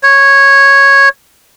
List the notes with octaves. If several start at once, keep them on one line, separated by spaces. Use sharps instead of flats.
C#5